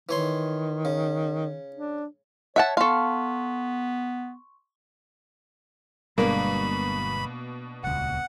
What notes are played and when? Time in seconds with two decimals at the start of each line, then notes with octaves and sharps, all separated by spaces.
0.09 D#3 E3 C#5 C6
0.85 C#3
1.76 D4
2.56 C#5 E5 F#5 A5
2.77 B3 A4 F5 C6 C#6
6.18 G1 B2 G3 G#3 A#3 D4 B5
7.84 D#1 C#2 F#5